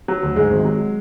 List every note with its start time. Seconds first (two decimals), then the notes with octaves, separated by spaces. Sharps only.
0.08 F#3
0.23 D2
0.36 G#2 G#3
0.51 G#1
0.65 F#3